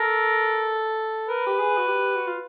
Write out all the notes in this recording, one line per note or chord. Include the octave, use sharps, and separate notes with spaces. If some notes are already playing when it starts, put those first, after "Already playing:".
Already playing: A4 A#4
A#4 B4
G4
G#4
F#4
G4
F#4
F4